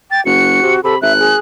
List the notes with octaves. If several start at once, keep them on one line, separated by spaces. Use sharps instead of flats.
G5 A6
F#1 F#4 C#7
C3
C3 A4 B5
G#1 E5 F#6
G#4